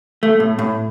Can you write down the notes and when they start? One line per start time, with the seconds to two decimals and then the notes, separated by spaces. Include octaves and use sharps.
0.23 A3
0.40 A2
0.59 A2